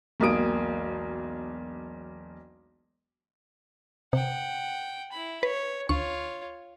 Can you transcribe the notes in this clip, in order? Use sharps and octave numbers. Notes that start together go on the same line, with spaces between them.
E1 B1 A#3 D#6 D7
C3 F#5 G5
E4 B5
B4 C#5
D2 F4 C#5 C#6